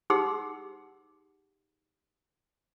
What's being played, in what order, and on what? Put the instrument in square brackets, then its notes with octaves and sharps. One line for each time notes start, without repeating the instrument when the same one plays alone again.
[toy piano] D#4 G4 G#4 F#5 C6 E6